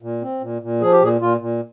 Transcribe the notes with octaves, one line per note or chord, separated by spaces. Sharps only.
A#2
C4
A#2
A#2
F3 G#4
G4
A#2 G#4
A#2 F4
A#2